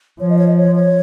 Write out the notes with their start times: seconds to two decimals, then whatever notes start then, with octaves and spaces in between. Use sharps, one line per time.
0.20 F3 C#5
0.29 D#5
0.38 C#5
0.48 D#5
0.57 C#5
0.75 C#5